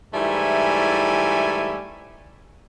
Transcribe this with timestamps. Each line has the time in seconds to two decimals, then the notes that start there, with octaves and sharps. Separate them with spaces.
0.14 G#2 E3 G3 A3 E4 G#5